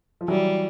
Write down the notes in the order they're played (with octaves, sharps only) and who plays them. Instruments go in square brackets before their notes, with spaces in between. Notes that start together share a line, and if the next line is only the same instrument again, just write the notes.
[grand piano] F3
[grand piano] E3 F#3 [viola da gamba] G3